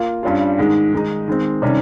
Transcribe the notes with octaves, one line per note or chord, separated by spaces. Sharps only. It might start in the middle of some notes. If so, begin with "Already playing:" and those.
Already playing: A#3 F4
G2 G3 C#4 F4
G#2 D#3 G#3
D#3 G#3 D#4
D#3 G#3 C4
C3 D#3 G3 C#4